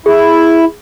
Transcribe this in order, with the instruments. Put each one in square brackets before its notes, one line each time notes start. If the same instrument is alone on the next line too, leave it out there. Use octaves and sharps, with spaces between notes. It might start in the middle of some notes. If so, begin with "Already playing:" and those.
[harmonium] E4 [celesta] G#4